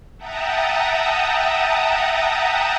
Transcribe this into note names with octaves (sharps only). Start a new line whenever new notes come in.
E5 F#5 G5 A5 A#5 D#6